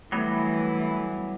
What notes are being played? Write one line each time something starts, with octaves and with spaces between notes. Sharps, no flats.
E3 F#3 G3 A3 B3